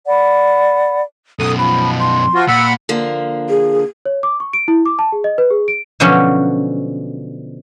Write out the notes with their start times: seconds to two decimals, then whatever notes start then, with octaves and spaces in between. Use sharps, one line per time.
0.07 D5 F#5 B5
1.39 F#2 B2 A4 D#6
1.59 F3 B5
2.00 C6
2.34 F3 F4 F#4
2.48 A#2 F#5 B5 E6
2.89 D3 F3 A#3
3.49 G#4
4.05 C#5
4.23 D6
4.40 C#6
4.53 D7
4.68 E4
4.86 D6
4.99 A5
5.12 G#4
5.24 D#5
5.38 B4
5.50 G#4
5.68 D7
6.00 B2 D3 F3 F#3 C#4